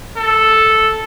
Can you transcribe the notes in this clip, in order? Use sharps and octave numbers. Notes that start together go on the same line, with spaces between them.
A4